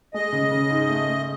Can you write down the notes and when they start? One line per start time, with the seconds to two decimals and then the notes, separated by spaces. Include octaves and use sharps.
0.14 G#3 D#5
0.33 C#3
0.51 C#3
0.70 G#2
0.89 A3
1.07 A3